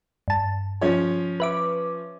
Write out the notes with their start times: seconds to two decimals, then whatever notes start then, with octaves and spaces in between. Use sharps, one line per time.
0.28 G2 A5
0.81 F3 C#4 C#5
1.40 B4 E5 D6